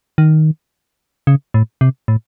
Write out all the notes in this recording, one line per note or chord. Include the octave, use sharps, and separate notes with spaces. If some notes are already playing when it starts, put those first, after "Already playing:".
D#3
C#3
A2
C3
A2